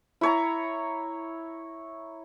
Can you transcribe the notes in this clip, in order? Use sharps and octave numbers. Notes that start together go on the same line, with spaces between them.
E4 C#5 A#5